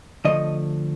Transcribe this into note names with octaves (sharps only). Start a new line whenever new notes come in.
D3 F3 A3 D#5